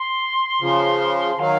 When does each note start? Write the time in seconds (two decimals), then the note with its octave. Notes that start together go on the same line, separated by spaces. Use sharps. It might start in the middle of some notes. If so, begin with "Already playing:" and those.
Already playing: C6
0.60 C#3 F3
1.39 D#3 F#3 F5